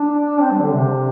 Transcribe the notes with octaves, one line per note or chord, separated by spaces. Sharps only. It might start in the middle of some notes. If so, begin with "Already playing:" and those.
Already playing: D4
C4
G3
D3
C3